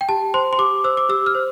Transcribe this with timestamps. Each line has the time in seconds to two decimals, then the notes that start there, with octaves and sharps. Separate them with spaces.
0.01 G5
0.09 G4 A5
0.34 C5 C6
0.53 C6
0.58 G4 D6
0.84 C5 E6
0.97 D6
1.09 G4 E6
1.26 F6
1.35 C5